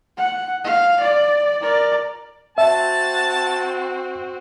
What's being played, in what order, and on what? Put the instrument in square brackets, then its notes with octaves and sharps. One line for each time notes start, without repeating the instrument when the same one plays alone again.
[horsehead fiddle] F#5
F5
D5
A#4 D5
[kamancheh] C4 F#4 [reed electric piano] E5 [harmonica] A5